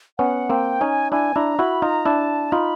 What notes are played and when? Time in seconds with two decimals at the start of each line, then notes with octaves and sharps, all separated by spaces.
0.18 B3 C#4 F#5
0.50 A#3 C4 G5
0.81 C#4 D#4 G#5
1.12 D4 E4 G#5
1.36 D4 E4 A#5
1.59 E4 F#4 B5
1.82 D#4 F4 A#5
2.05 D4 E4 A5
2.52 D#4 F4 B5